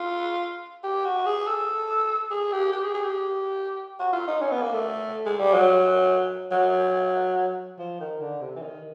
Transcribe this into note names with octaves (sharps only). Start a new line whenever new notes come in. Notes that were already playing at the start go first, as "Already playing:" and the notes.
Already playing: F4
G4
F#4
G#4
A4
G#4
G4
G4
G#4
G#4
G4
F#4
F4
D#4
C#4
B3
A#3
A3
G#3
G3
F#3
F#3
F3
D#3
D3
C3
E3
D#3